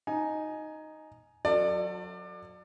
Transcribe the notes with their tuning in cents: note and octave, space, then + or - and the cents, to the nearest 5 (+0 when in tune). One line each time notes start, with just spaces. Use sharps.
D#4 +0 G#5 +20
F#3 -25 A4 +35 D5 +30